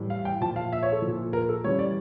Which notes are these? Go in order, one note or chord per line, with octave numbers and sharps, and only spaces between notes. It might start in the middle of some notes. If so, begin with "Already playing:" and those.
Already playing: A2 E3 G3
F5
G5
A#2 F3 A5
F5
E5
C#5
A4
F3
A#2
A#4
A4
C#3 E3 G3 C#5
D5